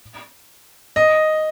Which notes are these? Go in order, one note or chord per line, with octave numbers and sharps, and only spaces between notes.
D#5